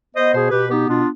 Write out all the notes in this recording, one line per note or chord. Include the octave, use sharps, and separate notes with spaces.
B3 C5 D#5
B2 G#4 C5
B2 G4 B4
B3 D#4 G4
B2 D4 F4